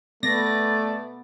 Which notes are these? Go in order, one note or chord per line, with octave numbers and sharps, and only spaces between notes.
A3 B3 D5 A#6